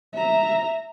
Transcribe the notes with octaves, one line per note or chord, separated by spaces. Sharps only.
E5 A#5